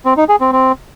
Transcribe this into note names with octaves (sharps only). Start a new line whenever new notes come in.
C4
D#4
G#4
C4
C4